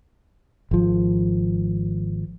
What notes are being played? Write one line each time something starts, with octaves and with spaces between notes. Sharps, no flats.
G#1 F3